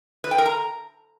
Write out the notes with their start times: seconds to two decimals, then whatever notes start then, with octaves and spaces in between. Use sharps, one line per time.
0.24 B4
0.31 G5
0.38 A#4
0.45 A#5